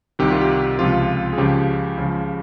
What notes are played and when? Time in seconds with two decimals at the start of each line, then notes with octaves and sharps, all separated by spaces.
0.19 C2 C3 D#3 G4
0.31 F4
0.41 G4
0.79 C#2 C3 F3 F4
1.33 G#4
1.38 C#2 C#3 F3 G4
1.97 C#2 C#3 F3